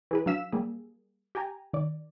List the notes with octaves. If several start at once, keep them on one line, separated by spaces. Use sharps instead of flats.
E3 G#4 B4
F#3 D4 F5 E6 B6 E7
G3 A#3 G#4
G4 G5 G#5 A#5
D#3 D5